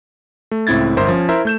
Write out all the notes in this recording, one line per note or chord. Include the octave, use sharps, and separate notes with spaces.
A3
C#2 A2 C4 E4 G#6 A6
G1 A#4 C5 E5 C6
F3 C#4
E4 A#4 C5 E5
A3 G6 E7